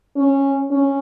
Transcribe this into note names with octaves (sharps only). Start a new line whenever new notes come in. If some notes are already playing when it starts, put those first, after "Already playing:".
C#4
C#4